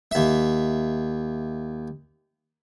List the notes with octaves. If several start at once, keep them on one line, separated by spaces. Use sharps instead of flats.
D#2 E5